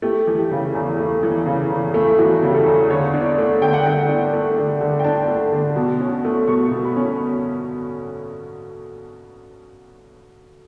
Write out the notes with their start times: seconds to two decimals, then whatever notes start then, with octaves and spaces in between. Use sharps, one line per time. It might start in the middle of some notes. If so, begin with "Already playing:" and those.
0.02 A3 G4
0.27 E3
0.38 G4
0.51 C#3
0.74 E2
0.98 A3
1.23 E3
1.46 C#3
1.70 E2
1.94 A3
2.07 E4
2.18 E3 F#4
2.42 C#3
2.49 G4
2.54 A4
2.66 E2
2.90 D3 C#5
3.14 D4
3.21 C#5
3.25 D5
3.38 A3
3.61 D3 G5
3.73 F#5
3.83 D3 G5
4.09 D4
4.33 A3
4.57 D3
4.81 D3
5.00 G5
5.04 D4 A5
5.28 A3
5.52 D3
5.76 B2
6.01 C#4
6.25 A3
6.47 B2 C#6
6.71 B2
6.84 B5
6.96 C#4